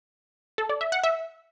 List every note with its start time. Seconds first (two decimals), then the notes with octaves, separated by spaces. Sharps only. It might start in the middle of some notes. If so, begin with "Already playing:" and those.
0.58 A4
0.69 D5
0.81 E5
0.92 F#5
1.04 E5